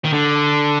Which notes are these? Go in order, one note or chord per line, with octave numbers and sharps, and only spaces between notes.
D#3
D3